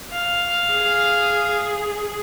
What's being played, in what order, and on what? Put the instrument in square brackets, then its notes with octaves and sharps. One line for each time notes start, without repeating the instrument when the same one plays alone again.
[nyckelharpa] F5
[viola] G#4